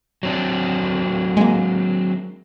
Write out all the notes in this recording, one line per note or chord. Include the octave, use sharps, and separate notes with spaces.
F#3 C4 D4
G#3 A#3